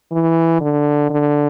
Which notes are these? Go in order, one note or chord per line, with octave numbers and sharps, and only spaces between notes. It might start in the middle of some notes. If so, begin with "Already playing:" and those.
E3
D3
D3